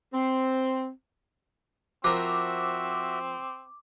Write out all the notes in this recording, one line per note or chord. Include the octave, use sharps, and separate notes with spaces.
C4
F3 C4 F#4 A#4 E5 D6